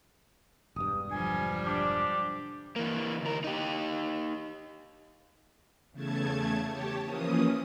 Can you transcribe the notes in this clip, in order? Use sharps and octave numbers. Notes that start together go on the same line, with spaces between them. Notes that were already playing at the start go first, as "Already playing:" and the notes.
E1 G2 D#6
D3 F3 G3 G#5
D4 G4
E3 A#3
D2 A#4
D#4 G4
E2 C#3 A3 A5 G#6
G4 C#5 A5
E3 F3 A#3 C#4 D#6